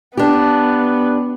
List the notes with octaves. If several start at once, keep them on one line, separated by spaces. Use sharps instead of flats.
B3 D4 G4